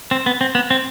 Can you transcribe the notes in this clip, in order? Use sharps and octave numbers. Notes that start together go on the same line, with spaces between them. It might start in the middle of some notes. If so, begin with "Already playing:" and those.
C4
B3
C4
B3
C4